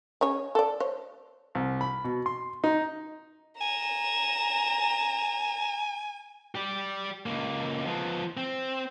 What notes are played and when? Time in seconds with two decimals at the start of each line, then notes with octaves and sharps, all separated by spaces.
0.21 C#4 G#4 C#5
0.55 A4 D5
0.80 C5 C#5
1.55 C2
1.81 B5
2.04 B2
2.26 C6
2.64 D#4
3.61 G#5 A#5 E7
6.55 G4 D5
7.26 C#2 A#3
7.86 F3 B3
8.37 C4